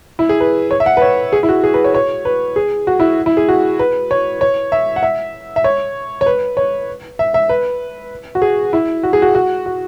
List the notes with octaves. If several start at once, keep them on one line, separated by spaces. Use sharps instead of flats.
E4
G#4
B4
C#5
E5
F#5
B4
C#5
G#4
E4
F#4
G#4
B4
C#5
C#5
B4
G#4
F#4
E4
E4
G#4
F#4
B4
C#5
C#5
E5
F#5
E5
E5
C#5
C#5
B4
C#5
E5
E5
B4
F#4
G#4
E4
F#4
G#4
F#4
F#4
F#4